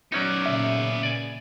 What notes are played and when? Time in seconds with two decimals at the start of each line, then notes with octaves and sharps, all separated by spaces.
0.12 F#3 B3 C#4 D#4 D5
0.46 A#2 C#3 E5
1.03 D5 G#5